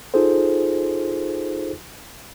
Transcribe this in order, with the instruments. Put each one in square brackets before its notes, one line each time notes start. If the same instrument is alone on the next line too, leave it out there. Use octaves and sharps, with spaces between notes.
[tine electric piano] D#4 F4 G#4 A4 C5